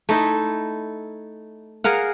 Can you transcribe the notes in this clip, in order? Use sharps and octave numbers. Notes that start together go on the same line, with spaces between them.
A3 D#4 E4
G#4 A#4 F5 F#5